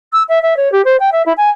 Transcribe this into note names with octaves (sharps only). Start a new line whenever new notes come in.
E6
E5
E5
C#5
G4
C5
G5
E5
E4
G#5